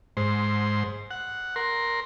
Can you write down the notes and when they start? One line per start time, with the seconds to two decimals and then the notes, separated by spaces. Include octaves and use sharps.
0.17 G#2 C5
1.11 F#5
1.56 A#4 C6